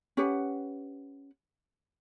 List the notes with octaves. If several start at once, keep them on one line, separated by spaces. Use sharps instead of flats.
C#4 G4 B4 F#5